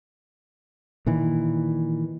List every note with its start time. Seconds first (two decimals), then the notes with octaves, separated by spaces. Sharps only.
1.06 A#2 D#3 E3